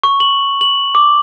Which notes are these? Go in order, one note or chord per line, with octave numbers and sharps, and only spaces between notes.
C#6
F#7
F#7
D6